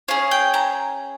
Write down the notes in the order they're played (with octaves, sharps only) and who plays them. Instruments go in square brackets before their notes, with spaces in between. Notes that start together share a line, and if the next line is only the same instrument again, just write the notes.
[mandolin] C#4 G#4 F5
G5
A#5